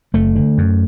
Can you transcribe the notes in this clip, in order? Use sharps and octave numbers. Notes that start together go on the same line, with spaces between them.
F#1 A3
D3
F#2